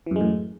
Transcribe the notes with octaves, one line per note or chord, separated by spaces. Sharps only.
F#2 A2 E3 G#3